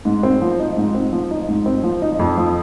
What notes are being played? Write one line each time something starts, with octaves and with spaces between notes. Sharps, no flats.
G#2
C4
F3
D#4
G#2
C4
F3
D#4
G#2
C4
F3
D#4
F2
F3